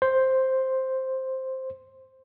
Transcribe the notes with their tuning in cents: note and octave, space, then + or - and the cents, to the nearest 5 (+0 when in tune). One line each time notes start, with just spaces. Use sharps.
C5 +5